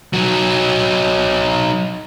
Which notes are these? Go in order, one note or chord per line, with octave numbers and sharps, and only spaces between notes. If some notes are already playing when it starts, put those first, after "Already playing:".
F#3 D#4